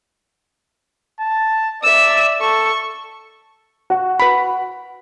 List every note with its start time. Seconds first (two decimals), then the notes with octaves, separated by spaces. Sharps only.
1.20 A5
1.84 D5 E5 E6
2.41 A4 C#6
3.90 F#4
4.20 B4 B5